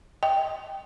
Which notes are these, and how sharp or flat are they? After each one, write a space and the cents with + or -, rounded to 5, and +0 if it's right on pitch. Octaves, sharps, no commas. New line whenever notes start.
D#5 +30 G5 +0